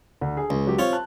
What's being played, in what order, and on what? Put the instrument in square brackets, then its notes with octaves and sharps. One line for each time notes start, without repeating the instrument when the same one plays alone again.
[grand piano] D2
G#4
[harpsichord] C#2
[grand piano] F#3 G4
[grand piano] C4 [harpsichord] F4 C#5
[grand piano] A5 F#6